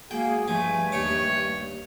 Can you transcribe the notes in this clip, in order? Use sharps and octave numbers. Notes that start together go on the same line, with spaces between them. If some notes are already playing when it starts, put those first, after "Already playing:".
G#3 A#3 F#4 G#4 G5
G2 F3 A3 G#5
D#2 C#5 D6